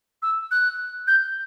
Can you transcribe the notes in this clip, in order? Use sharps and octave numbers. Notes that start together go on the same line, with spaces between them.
E6
F#6
G6